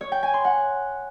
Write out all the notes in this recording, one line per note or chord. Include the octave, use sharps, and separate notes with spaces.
C#5
G5
G#5
C6
F#5